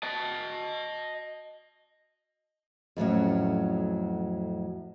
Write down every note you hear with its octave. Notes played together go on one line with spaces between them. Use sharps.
D#5 A5
F2 A2 F#3 C#4